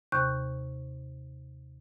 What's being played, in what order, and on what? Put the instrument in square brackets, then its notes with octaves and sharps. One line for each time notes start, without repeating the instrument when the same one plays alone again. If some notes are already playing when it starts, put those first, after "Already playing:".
[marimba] D#2 C3 C#6 F#6 G6